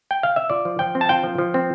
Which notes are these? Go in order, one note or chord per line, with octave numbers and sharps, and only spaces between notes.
G5
F5
E5
F4 D5
F3
F3 G5
C4
A5
F4 G5
F3
F3
C4